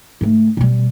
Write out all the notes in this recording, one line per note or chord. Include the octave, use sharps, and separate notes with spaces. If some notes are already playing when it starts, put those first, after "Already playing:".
G#2 A3
B2 G3